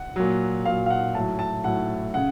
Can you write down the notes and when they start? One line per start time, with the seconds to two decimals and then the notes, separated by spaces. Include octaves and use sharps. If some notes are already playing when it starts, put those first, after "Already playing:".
Already playing: F#5
0.16 A#2 F#3
0.65 A#2 F#3 F5
0.86 F5
0.90 F#5
1.15 A2 F#3 A5
1.39 A5
1.64 A2 F#3 F#5
2.14 C#3 F#5